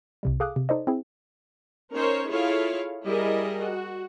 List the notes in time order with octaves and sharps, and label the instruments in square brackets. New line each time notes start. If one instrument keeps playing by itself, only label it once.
[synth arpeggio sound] C2 C3 G3
G#4 A4 F5 D6 D#6 F#6
C3
D#4 A4 C5 D5 D#5
C4 E4 G#4
[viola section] C#4 D#4 A#4 C5 C#5
E4 F4 G#4 A4 C#5 F5
G3 E4 G#4 A#4 D#5
F#4